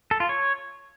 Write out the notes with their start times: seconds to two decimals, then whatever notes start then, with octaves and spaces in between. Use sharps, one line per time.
0.11 A4
0.20 F4
0.29 C#5